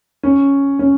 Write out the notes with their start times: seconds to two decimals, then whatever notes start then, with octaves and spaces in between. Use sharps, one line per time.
0.23 C#4
0.79 C#4